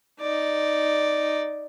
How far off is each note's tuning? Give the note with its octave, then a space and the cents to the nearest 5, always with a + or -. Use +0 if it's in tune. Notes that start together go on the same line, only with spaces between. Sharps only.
D#4 +0 D5 +0